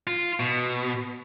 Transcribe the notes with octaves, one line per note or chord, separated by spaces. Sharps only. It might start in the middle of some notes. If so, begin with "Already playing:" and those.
F4
B2